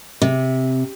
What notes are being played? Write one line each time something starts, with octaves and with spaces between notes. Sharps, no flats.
C3